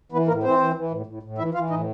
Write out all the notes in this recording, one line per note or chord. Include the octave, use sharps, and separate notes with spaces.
E3 B3 B4
A2 A#3 A#4
E3 C4 C5
E3
E3
A2
A2
A2
E3 E4 E5
E3 F4 F5
A2 D#4 D#5